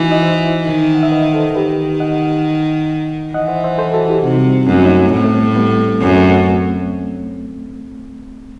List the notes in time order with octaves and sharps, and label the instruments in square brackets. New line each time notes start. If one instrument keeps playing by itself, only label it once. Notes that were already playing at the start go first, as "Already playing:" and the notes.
Already playing: [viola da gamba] E3 [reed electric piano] D#4 E4 F#4
[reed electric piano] D#5
C5 E5
[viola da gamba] D#3
[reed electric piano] F#5
E5
B4 D#5
A4 C5
[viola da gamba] D#3 [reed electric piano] G4 B4
[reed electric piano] D#5 F#5
[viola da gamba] E3 [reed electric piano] D#5 F#5
[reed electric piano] C5 E5
C5 E5
A4 C5
F#4 A4
E4 G4
[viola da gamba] C3 [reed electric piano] D#4 F#4
[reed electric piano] G3
[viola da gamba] F#2 [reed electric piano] A3 C4
[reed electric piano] B3 D#4
A3 C4
[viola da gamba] A2 [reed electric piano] A3 C4
[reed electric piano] A3
G3 B3
G3 B3
[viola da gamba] F#2 [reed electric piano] A3 C4
[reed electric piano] A3
A3